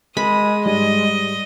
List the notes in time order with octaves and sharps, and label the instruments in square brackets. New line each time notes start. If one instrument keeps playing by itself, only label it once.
[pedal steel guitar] G#3 [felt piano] A#4 [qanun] B5 [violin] D#6
[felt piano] G#2 G3 [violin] D#5